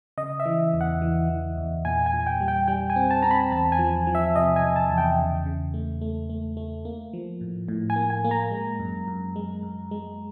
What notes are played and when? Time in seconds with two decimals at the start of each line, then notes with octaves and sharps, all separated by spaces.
0.18 C#3 D#5
0.40 E5
0.46 E3
0.74 E2
0.81 F#5
1.02 E3
1.30 E3
1.58 E2
1.85 A#2 G#5
2.06 G#5
2.13 A#2
2.27 G5
2.41 G3
2.48 G5
2.68 G3 G5
2.90 G#5
2.96 C4
3.11 A5
3.22 C4 A#5
3.31 B5
3.51 E2 A5
3.72 G#5
3.79 F3
4.07 F3
4.15 E5
4.35 C3 D#5
4.56 G#5
4.63 C3
4.76 A5
4.90 E2
4.98 G5
5.19 C#3
5.46 C#3
5.74 A3
6.01 A3
6.30 A3
6.57 A3
6.85 A#3
7.13 F3
7.41 A2
7.68 A2
7.90 G#5
7.96 A#3
8.10 G#5
8.25 A#3
8.31 A#5
8.51 G#3
8.79 F#2
9.08 F#2
9.36 G#3
9.63 F#2
9.91 G#3